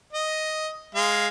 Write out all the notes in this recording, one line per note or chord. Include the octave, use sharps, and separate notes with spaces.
D#5
G#3 F5